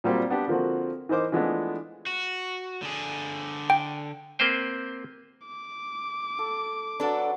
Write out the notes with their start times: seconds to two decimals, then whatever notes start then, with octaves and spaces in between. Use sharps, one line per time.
0.04 A#2 F#3 G3 A#3 C4 G4
0.30 B3 D4 G4
0.48 D3 F3 A#3 C4 F#4
1.09 E3 D#4 A#4 C5 D6
1.32 E3 F3 G#3 A3 B3 D4
2.06 F#4
2.82 D3 G#4
3.70 G5
4.39 A#3 C4 B4 C5 G5
5.47 D6
6.39 A4
7.00 F#3 D4 A4 B4